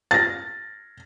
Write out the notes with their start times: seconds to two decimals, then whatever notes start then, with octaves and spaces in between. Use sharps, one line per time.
0.11 A6 A#6